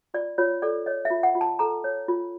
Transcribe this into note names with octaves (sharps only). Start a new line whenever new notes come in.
F4 D5
F4 C#5
A4 D5
C#5 D#5
E5
F4
F#5
F4
A5
A4 A#5
C#5
F4